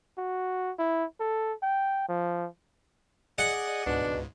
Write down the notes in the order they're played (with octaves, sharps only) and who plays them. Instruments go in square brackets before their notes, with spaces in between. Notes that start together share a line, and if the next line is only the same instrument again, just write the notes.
[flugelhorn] F#4
E4
A4
G5
F3
[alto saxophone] G#4 [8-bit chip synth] D5 D#5 [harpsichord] F#5
[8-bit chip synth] C#2 G#2 [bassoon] B2 [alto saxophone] D4